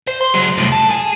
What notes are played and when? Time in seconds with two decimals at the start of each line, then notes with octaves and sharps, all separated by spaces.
0.07 C5
0.21 C6
0.34 F#3 G#3
0.58 C2 A2
0.72 A4
0.91 G#4